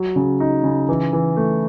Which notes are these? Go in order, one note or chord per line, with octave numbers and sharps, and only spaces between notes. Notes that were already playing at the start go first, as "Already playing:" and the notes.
Already playing: F#3
C#3
D#4
C#3
E3
E3
A3